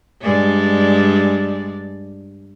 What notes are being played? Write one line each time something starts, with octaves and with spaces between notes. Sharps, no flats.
G2 G#3 D5